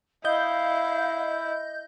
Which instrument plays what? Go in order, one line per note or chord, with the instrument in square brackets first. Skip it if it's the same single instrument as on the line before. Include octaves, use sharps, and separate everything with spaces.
[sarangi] E4 [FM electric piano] D#5 G6 [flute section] F5